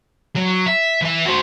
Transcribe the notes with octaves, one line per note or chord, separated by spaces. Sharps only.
F#3
E5
E3 E5
F#4 C5